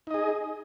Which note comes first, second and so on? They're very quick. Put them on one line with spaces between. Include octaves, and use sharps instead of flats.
D#4 D#5 G#4